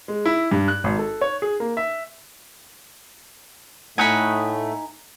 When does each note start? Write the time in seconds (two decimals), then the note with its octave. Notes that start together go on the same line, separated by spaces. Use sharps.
0.08 G#3
0.25 E4
0.51 G2
0.68 F#6
0.84 G#1
0.99 A4
1.21 C#5
1.42 G#4
1.60 A#3
1.77 E5
3.98 A2 A3 D#4 F#5 G#5 B5